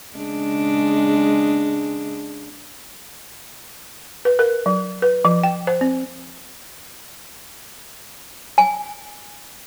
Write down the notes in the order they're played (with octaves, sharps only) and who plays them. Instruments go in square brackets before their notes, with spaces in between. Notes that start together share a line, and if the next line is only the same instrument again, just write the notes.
[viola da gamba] C#3 G#3 D4
[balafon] B4
A#4
F#3
B4
F3
G5
C5
C4
[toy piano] G#5